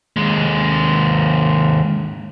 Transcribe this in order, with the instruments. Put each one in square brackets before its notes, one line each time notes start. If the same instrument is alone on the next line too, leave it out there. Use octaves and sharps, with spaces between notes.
[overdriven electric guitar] D#2 G#3